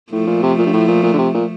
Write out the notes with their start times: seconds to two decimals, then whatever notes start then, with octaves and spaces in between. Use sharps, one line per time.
0.11 A2 F3 A3
0.27 A#2
0.42 C3
0.58 A#2
0.66 G2
0.73 A2
0.88 A#2
1.03 A#2
1.13 D3
1.18 C3
1.34 A#2